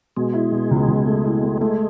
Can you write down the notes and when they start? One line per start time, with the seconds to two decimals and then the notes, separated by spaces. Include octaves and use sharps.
0.17 B2 G#3
0.34 E4
0.52 B2
0.71 C#2
0.88 C#2
1.06 A3
1.25 E4
1.43 A3
1.61 G#3 A3